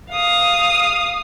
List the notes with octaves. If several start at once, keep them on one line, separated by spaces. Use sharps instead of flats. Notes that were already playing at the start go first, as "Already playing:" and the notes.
F5 D#6